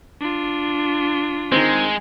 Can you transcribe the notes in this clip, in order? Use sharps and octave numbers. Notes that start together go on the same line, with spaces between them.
D4 F4
D#3 G#3 C4